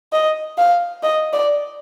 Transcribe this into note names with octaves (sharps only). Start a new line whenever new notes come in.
D#5
F5
D#5
D5